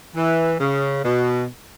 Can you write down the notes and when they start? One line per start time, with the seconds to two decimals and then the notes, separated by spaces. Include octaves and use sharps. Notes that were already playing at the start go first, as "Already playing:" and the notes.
0.16 E3
0.60 C#3
1.04 B2